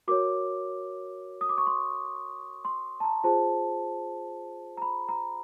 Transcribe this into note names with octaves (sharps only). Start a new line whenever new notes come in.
F#4 A#4 C#5 D6
D#6
D6
C#6
C6
C6
A5
A#5
F4 G#4 C5 A5
A#5
B5
A#5